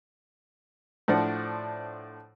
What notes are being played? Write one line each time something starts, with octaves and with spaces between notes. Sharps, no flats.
A2 F3 D4 C5 F#5